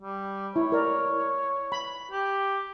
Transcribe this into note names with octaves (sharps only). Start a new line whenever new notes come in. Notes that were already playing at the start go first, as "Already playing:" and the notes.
G3
E4 C#5
A#4 D5
B5
G4